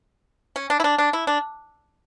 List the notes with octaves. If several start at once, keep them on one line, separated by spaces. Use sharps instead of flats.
C#4
D4
E4
D4
D4
E4
D4